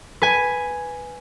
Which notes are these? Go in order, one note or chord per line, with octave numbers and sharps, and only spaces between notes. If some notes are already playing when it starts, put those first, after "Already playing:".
B4 G#5